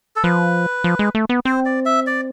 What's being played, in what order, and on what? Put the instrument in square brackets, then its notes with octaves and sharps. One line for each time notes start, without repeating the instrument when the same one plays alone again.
[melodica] A4
[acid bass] F3 [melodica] B4
[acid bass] F3
G#3
A3
B3
[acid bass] C4 [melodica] C5
[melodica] D5
E5
D5